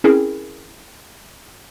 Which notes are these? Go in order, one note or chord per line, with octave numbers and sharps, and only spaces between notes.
C4 C#4 E4 G#4 A#4